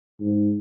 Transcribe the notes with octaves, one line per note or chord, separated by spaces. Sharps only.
G#2